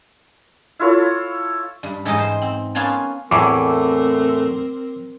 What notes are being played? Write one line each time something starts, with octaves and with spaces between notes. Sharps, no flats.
E4 F4 A4 C#5
G2
G#2 E3 D#4 D#5
C5
C4
A#3 B3 C#4 F4 G#5 A5
E2 A2 E3 A3 C4 A#4 D6